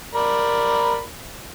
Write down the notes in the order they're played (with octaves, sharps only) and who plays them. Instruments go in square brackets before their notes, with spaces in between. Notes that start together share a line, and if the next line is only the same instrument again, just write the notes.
[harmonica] A#4 D5 B5